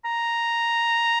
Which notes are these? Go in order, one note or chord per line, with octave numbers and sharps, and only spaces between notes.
A#5